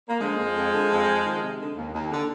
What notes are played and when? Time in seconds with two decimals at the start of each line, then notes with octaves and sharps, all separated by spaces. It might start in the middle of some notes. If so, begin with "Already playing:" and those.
0.09 A#3
0.20 D3 F3 G#3
0.38 F2
0.56 F2
0.73 D3
0.91 F2
1.07 F2
1.25 D#3
1.42 C3
1.60 D3
1.76 D#2
1.94 D#2
2.12 D3